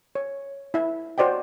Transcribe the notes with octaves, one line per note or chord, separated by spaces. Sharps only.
C#5
E4 E5
F#4 C5 D5 D#5 G5